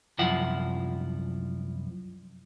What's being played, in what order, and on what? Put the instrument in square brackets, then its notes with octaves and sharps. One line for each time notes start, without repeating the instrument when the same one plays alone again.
[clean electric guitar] C2 F#2 F3 E4 F#5